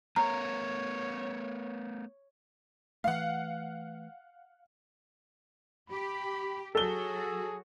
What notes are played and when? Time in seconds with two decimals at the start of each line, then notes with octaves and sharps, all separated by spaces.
0.16 A3 B3 A#4 C#5 A#5
3.04 E3 A3 F5 F#5
5.90 G4 B5
6.75 F#3 F#4 G#4 A4 G7